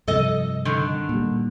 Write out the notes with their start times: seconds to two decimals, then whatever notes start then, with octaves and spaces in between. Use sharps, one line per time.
0.08 G2 C3 F3 A4 D#5
0.65 D3 D#3
1.09 A#2 G3